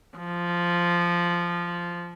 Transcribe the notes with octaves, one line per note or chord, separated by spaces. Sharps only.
F3